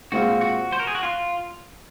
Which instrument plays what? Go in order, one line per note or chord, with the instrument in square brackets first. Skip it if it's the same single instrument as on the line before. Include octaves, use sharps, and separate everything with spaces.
[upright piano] A#2 G#3 C4 F4 [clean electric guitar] F#4
[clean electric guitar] F#4
C5
A#4
G#4
F#4
F4